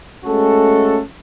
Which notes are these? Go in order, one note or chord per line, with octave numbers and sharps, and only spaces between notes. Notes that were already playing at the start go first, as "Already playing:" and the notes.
G#3 A3 C#4 F#4 A4